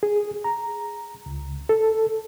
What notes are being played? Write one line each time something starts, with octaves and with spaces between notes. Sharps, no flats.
G#4
A#5
C#2
A4